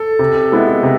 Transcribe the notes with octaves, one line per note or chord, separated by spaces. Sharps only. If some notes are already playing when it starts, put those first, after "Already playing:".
Already playing: A4
C3
G#3 B3 E4
C3